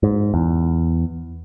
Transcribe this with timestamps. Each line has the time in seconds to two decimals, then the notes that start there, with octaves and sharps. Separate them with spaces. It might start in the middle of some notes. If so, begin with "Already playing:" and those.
0.03 G#2
0.34 E2